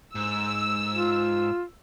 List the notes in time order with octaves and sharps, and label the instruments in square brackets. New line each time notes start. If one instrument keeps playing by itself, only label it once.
[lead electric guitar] G#2 [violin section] E6
[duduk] F4